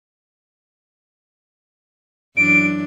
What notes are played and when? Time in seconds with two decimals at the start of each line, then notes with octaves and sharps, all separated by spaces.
2.37 F#2 E3 D4 D7